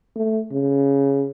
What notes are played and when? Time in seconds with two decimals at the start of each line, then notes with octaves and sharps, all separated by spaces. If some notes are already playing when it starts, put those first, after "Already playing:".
0.16 A3
0.52 C#3